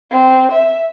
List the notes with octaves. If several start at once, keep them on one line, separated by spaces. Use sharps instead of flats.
C4
E5